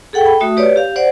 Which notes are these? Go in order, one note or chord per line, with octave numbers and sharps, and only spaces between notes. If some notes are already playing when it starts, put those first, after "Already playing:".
G#4 A4 F#5 G5
G5 B5
A3 F#4 E5 D#6
G4 B4 C#5 D5
G4 F5
C5 D5 F#5